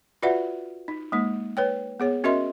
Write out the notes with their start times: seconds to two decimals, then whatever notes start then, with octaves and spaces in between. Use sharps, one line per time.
0.22 F4 F#4 B4 D5 E5 F#5
0.88 D#4
1.12 G#3 A#3 D#4
1.57 B4 C#5 G5
2.00 B3 G#4 C#5
2.24 C#4 F#4 A#4 D#5 E5 C6